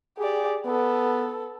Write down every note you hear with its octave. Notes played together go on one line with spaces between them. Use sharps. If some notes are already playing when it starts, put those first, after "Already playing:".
G4 G#4 D5
B3 A4